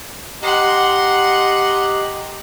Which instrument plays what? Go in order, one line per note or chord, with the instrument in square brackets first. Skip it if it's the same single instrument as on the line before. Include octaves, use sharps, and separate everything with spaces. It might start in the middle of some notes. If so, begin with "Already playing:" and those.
[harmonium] G4 D#5 A#5 [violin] F#5 C6